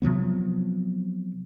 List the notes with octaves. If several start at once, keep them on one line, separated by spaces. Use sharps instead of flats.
C3 F3 F#3 B3